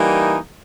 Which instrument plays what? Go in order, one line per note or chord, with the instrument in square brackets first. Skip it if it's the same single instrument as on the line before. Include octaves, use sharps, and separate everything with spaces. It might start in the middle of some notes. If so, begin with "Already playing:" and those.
Already playing: [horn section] E3 G3 A#3 D#4